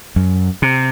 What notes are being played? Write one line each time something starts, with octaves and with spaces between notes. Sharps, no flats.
F#2
C3